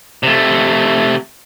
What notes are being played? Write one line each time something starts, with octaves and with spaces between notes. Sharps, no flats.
C3 A3